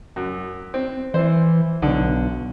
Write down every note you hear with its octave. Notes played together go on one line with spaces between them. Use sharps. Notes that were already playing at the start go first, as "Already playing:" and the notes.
F#2
C4
E3 C5
B1 D3